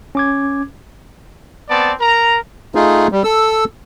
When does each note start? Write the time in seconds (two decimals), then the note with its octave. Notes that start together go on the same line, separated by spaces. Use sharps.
0.15 C#4 D6 G#6
1.69 B3 C4 D5 A5
1.99 A#4 A#5
2.75 A3 D#4 F4 G#4
3.12 G3
3.24 A4 E6